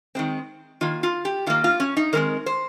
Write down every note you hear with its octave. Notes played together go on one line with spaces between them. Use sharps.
D#3 G#3 C4
D#3 A#3 F4
F4
G4
D#3 A#3 F4
F4
C#4
D#4
D#3 G#3 C4 A#4
C5